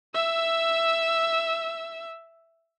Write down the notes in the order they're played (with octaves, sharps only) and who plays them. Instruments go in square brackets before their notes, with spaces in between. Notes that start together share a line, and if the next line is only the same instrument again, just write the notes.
[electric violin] E5 E6